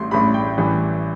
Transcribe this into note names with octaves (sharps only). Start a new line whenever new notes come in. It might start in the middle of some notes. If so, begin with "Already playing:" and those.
Already playing: A1 A2 G3 C6
A1 A2 G3 B5
G5
A1 A2 E3 G3